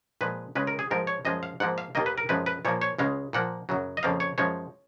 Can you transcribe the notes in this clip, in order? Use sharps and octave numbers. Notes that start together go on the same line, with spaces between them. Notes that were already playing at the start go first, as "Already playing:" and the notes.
A#2 F3 G#3 B4
C#2 C#3 G#3 B4
A#4
G#4
G#2 F3 G#3 A#4
C#5
F#2 F3 G#3 D#5
F5
G#2 F3 A#3 F#5
F5
D#2 D#3 A#3 D#5
B4
A#4
F#2 F3 G#3 B4
B4
A#2 F3 A#3 C#5
C#5
C#2 C#3 G#3 F5
A#2 F3 A#3 F#5
F#2 C#3 F#3
D#5
F2 C#3 F3 A#3 F5
C#5
F#2 F3 G#3 C#5